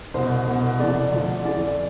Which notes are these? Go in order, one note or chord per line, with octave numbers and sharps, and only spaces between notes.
C2 B2 C5
C2 B2
F2 C3 E3 D5
D2 D3 F3
F2 E3 D5